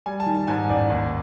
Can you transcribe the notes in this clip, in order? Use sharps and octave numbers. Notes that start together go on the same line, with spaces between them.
G3 G#5
A5
D#3
A5
G#2 G#5
A1 D5
D#2